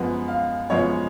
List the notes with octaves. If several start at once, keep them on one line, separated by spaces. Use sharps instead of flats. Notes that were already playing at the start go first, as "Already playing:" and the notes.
Already playing: F#2 F3 G#3 B3 F#5
F5
F#2 F3 G#3 B3 C#5